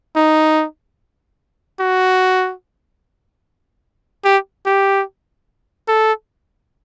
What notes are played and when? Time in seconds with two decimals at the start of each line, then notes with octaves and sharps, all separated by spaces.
0.16 D#4
1.79 F#4
4.24 G4
4.66 G4
5.88 A4